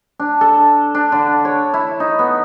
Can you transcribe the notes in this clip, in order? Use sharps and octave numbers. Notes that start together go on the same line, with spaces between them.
D4
A4
D4
D3
C#5
E4
D#4
B3